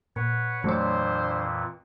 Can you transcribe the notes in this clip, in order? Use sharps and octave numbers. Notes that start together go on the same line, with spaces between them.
A#2 B4 C#5 F#5
F2 A#2 E3 F#3 A3 D4 C5 C#5